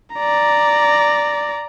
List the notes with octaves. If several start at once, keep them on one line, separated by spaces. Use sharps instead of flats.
D5 A#5